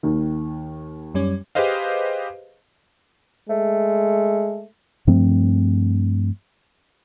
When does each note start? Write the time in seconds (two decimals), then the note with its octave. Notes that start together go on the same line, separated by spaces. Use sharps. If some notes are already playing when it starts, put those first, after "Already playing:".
0.03 D#2 D#3
1.14 F#2 G3 C#4
1.55 G4 G#4 B4 C5 D#5 F5
3.49 G#3 A3
5.07 G2 F3 A3 C4